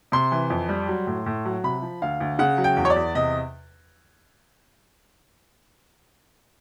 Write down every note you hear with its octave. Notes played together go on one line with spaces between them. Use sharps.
C3 C6
E3
F2
G3
F#3
A2
A2
F#3
C3 B5
F3
D2 F5
D2
C#3 F#5
F#3
G5
E2
C#5
D5
E2
C3 D#5